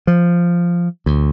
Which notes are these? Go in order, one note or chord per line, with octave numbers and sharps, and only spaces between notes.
F3
D2